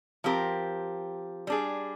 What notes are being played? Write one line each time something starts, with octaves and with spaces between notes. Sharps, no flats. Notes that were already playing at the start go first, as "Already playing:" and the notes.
F3 C4 G4 A#4
G3 D4 G#4